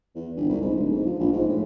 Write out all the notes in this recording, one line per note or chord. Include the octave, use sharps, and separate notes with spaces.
E2
G1
C2
G#2
D1
G#2
F3
A#1
G#2
A2